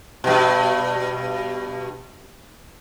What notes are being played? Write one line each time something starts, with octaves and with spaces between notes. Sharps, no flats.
G2 B2